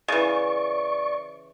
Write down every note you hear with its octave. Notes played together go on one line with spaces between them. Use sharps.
C#3 E3 D5 C#6